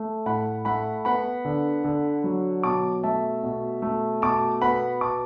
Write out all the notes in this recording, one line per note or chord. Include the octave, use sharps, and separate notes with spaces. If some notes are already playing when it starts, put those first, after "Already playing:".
Already playing: A3
A2 F#5 B5
A3 F#5 B5
B3 F#5 B5
D3
D3
F#3
B2 A5 D6
A3 E5 A5
B2
A3
B2 A5 D6
B3 F#5 B5
B2 A5 D6